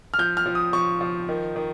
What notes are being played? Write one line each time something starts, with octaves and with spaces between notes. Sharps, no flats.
F6
F3 G6
F6
F3
D#6
F3 C#6
F3
D#3
D#3